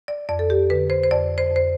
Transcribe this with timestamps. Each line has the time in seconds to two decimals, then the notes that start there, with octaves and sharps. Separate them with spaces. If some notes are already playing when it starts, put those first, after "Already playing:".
0.08 D5
0.29 F2 D5
0.39 A4
0.50 G4
0.70 D3 B4
0.90 C5
1.03 C5
1.11 F2 D5
1.38 C5
1.51 F2 C5